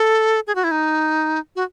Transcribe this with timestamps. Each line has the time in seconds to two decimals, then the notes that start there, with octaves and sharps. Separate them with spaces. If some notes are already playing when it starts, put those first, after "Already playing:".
Already playing: A4
0.47 G#4
0.55 F#4
0.64 E4
0.71 D#4
1.56 F#4